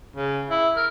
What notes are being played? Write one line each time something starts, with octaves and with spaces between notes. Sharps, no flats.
C#3
E4
A#4